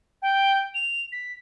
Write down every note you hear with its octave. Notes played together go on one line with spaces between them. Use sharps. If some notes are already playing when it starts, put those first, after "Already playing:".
G5
F7
B6